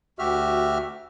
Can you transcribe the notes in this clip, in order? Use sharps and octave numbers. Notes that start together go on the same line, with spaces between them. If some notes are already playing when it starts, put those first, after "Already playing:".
D2 F#4 G4 E5 F6